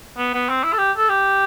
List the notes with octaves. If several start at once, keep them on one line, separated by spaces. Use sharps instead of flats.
B3
B3
C4
E4
A4
G4
A4
G4